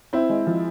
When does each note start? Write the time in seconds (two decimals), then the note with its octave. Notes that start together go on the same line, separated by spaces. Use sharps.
0.13 C4 E4
0.29 G#3
0.47 F3